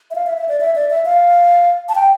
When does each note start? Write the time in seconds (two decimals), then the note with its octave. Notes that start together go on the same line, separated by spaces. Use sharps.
0.11 E5
0.15 F5
0.27 E5
0.37 E5
0.49 D5
0.61 E5
0.76 D5
0.90 E5
1.05 F5
1.89 A5
1.95 G5